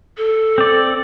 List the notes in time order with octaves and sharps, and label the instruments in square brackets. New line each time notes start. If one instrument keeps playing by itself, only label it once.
[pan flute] A4
[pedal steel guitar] C4 D5